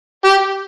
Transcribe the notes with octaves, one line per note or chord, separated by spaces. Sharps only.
G4